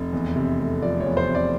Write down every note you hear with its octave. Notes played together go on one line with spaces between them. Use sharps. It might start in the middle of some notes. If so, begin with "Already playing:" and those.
Already playing: F1
E2
C3
A3
F3 D5
C#5
E2
C5
C3
D5